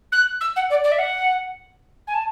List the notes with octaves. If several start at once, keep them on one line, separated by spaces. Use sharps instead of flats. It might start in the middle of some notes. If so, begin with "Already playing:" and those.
F#6
E6
F#5
D5
D5
E5
F#5
G#5
A5